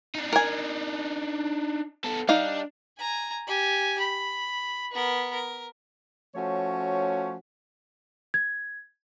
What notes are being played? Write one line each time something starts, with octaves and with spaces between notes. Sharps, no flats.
D4 D#4
A#4 G#5
B3 A4
G3 D4 D#4 F5
G#5 A#5
G4 G#5
B5
B3 A#4
A#4
F3 A3 C#4 F#4 C#5
G#6